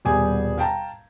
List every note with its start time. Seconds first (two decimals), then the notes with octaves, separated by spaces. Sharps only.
0.05 D#1 B2 G3 G4 G#4 G#5
0.58 F5 G5 A5 A#5